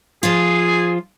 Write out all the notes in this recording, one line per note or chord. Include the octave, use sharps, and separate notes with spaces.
F3 F4 G#4